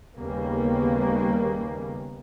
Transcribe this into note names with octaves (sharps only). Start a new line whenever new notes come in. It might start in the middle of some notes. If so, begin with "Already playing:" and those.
D#2 C#3 G3 A#3 B3